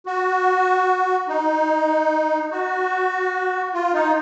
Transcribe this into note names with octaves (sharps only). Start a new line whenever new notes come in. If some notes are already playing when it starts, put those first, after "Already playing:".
F#4
D#4
F#4
F4
D#4